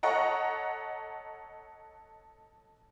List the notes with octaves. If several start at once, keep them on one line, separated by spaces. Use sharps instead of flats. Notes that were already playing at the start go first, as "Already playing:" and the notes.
A4 C#5 D#5 F#5 A#5